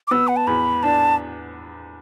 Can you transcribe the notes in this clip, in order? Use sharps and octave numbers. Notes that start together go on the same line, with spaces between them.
D6
B3 E6
F#5
A5
E2 B5
D4 A5